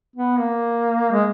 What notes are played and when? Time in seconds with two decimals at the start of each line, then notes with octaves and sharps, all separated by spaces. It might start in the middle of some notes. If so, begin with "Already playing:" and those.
0.16 B3
0.39 A#3
1.12 G#3